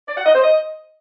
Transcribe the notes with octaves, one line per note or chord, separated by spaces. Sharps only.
D5
F#5
D#5
C5
D#5